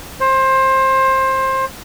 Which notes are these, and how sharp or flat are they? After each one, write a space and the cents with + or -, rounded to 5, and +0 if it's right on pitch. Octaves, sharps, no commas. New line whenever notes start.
C5 +20